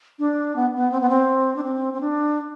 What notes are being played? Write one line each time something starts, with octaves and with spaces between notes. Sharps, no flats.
D4
B3
B3
C4
B3
C4
D4
C4
C4
D4